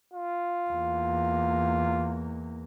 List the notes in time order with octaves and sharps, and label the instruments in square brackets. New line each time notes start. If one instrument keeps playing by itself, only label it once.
[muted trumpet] F4
[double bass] E2 A#3